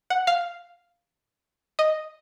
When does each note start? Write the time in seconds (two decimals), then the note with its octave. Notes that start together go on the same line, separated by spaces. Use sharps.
0.10 F#5
0.27 F5
1.79 D#5